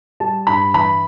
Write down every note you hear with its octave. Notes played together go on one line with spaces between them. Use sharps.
G3 A5
G2 B5
E3 B5